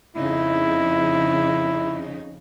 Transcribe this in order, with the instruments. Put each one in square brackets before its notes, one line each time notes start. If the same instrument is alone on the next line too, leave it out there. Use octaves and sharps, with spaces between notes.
[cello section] F2 C#3 D#4 [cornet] E4